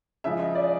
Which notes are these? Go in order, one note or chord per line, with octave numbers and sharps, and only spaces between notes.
C#3 F3 G#3 E5
D#5
D5